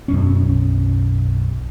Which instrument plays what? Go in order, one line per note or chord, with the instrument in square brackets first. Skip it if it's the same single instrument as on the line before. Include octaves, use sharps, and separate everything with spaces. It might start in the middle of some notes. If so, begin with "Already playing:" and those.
[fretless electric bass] B1 F#2 C#4